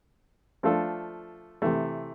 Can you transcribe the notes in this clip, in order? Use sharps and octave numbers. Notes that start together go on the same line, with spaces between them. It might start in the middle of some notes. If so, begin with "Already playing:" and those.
F3 A3 D4 F4 A4
C3 E3 A3